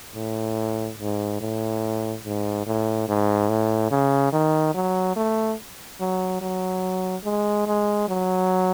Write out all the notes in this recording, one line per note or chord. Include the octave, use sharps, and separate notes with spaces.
A2
G#2
A2
G#2
A2
G#2
A2
C#3
D#3
F#3
A3
F#3
F#3
G#3
G#3
F#3